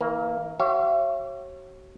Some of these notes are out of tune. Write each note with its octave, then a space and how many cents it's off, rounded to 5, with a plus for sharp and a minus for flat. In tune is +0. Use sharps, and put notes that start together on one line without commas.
E3 -40 A#3 +0
F#4 +40 C#5 -30 E5 +45